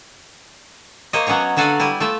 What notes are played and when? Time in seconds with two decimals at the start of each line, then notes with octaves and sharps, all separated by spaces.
1.13 A#3 C5 C#5 D#5
1.27 F#3 B3 C#4 C#5 A#5
1.57 D3 F#3 F#4 A4 F5 G#5
1.80 G3 E4 G#5
2.00 A3 F4 E5